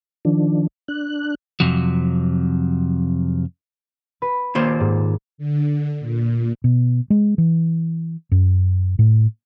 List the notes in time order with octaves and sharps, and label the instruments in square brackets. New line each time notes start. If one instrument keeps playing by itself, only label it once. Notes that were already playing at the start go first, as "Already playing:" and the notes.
[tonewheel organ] D#3 F3 D4
D4 F#6
[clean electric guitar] F2 C3 F3 F#3
[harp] B4
[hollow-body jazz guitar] D#2 A#2 C5 [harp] D7
[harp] G#2
[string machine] D3
A#2
[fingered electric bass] B2
G#3
E3
F#2
A2